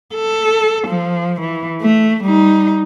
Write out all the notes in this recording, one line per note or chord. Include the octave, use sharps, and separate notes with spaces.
A4
F3
E3
A3
G3 D#4